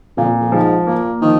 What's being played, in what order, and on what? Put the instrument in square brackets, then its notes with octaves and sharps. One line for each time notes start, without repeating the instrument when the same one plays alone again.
[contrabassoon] F2 [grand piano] A#2
[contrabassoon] F2
[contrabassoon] G#2 [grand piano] F3
[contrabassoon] A#2 [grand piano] A#3
[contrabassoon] D#3 [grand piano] F3